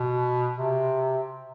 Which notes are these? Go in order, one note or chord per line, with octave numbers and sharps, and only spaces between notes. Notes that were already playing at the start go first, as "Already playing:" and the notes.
Already playing: B2
C3